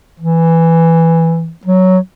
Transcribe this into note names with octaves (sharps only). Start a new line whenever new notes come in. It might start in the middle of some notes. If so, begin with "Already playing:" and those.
E3
F#3